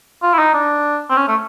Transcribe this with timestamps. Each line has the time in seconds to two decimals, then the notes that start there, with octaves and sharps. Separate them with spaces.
0.23 F4
0.34 E4
0.39 D#4
0.54 D4
1.10 C4
1.17 C#4
1.28 A3